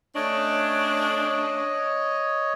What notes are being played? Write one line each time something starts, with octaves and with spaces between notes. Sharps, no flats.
A3 C#4 D4 C#5 D#5